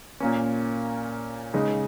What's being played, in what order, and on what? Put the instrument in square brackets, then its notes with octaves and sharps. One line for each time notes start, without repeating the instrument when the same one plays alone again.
[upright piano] A#2 A#3 C#4
C#3 G#3 D#4